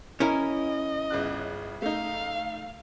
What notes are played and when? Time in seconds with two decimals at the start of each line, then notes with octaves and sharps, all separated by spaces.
0.20 C#4 E4 A#4 D#5
1.10 G1 C#3 F#6
1.82 A3 D#4 F5